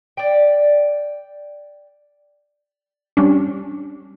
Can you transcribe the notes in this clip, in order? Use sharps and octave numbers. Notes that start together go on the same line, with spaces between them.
D5 G5
G3 C#4 D4